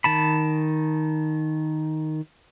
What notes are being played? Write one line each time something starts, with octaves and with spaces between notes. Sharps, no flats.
D#3 A5 B5